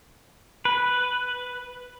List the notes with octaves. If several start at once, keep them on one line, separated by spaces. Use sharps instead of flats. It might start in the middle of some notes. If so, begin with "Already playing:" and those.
B4